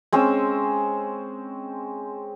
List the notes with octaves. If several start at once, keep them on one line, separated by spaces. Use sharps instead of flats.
G#3 C4 C#4 E6